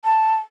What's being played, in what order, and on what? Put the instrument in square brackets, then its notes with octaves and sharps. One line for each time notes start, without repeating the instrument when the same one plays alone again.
[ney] A5